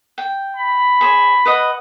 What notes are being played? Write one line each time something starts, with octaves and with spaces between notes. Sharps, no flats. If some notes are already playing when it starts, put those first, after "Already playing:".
G5
B5
G#4 C5 C#5
B4 D#5 F#5